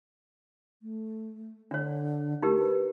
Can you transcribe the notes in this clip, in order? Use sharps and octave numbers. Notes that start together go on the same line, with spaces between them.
A3
D3 D4 C#5
A3 D#4 G4 A#4
B4